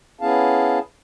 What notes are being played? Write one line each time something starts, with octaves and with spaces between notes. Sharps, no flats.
B3 C#4 E4 G#4 F5 A5